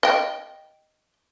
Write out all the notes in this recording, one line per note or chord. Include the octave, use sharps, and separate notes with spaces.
D#5 G5